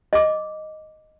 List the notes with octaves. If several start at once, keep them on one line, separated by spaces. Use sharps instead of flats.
D#5 D6